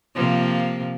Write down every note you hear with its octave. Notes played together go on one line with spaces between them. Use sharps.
C3 F3 A#3